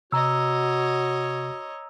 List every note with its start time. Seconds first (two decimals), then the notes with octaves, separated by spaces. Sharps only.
0.12 C3 F#4 C#5 D#5 A#5 E6